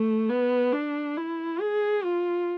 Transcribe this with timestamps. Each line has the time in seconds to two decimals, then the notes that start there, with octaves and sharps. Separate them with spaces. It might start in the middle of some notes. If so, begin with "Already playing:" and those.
Already playing: A3
0.29 B3
0.73 D4
1.17 E4
1.61 G#4
2.04 F4